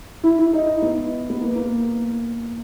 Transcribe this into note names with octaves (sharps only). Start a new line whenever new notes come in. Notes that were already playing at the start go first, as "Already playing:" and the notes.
E4
E4
D#4
B3
B3
A#3
A#3